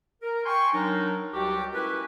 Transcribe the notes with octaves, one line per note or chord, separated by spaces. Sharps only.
A#4
G5 G#5 C6 C#6
F#3 D4 D#4 A#4
C#2 F#3 G3 F#4 G4
A3 C#4 E4 F#4 A#4 B4